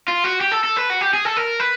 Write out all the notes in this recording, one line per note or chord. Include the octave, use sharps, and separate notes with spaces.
F4
F#4
G4
A4
A4
B4
F#4
G4
G#4
A4
A#4
B4